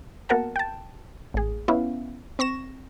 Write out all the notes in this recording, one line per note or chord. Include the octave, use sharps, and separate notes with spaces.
A#3 B3 F#4 A#4 F#5 A5
G5 A5
A1 G#4
B3 C#4 E4 B4 F5
C4 C#6 A#6 E7